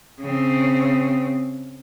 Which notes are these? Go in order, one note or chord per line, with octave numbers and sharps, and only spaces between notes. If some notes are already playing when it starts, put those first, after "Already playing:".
C#3 C4